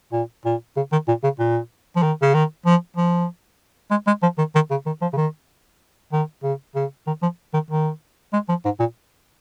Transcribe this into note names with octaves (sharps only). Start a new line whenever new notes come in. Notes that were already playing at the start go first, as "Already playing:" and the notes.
A#2
A#2
C#3
D#3
A#2
C#3
A#2
F3
D#3
C#3
D#3
F3
F3
G#3
G#3
F3
D#3
D#3
C#3
D#3
F3
C#3
D#3
D#3
C#3
C#3
D#3
F3
D#3
D#3
G#3
F3
G#2
A#2